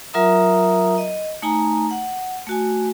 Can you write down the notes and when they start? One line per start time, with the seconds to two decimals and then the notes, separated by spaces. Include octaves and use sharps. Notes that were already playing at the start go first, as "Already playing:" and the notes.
0.14 F#3 F4 A#4 E5 A#5 D#6
0.98 D#5
1.42 A3 D#4 G#5 A#5
1.91 F#5
2.47 A3 F#4 G#5